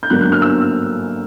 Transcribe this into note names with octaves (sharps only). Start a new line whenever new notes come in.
G6
G2 D3 F#3 A#3 F#6
F#6
F6
E6